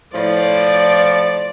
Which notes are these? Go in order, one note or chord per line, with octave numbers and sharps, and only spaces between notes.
A2 F3 D5